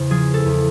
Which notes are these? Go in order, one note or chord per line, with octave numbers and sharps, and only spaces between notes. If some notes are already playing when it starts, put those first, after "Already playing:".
Already playing: E2 C#3 C5
F3 G#4
A4
E2